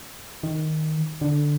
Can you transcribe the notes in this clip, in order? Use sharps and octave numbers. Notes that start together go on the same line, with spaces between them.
D#3
D3